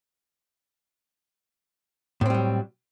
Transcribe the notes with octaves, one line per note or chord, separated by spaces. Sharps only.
A2 F#3 G3 C4